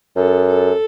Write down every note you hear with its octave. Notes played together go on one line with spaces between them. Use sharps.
F#2 A4
A4